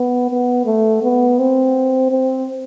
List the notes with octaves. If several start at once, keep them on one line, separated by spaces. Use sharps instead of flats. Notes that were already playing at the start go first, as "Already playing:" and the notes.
Already playing: B3
B3
A3
B3
C4
C4